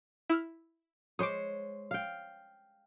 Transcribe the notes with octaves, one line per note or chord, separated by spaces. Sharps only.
E4 E6 F6
G#3 C5 C#5 D6 D#6
F5 G5